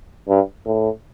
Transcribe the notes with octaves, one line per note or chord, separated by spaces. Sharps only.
G2
A2